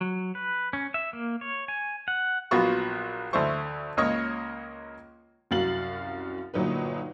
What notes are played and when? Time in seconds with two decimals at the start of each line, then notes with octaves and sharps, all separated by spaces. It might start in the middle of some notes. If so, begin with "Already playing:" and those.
0.01 F#3
0.35 B4
0.73 C#4
0.94 E5
1.13 A#3
1.41 C#5
1.68 G#5
2.08 F#5
2.51 A#1 F#3 B3 F4 F#4 C#6
3.33 D2 A3 E4 C5 C#6
3.97 C#2 A#3 C#5 D#5 C#6
5.51 C2 F#2 F#4 F5 A6 F#7
6.54 G1 A#2 F#3 D#4 B4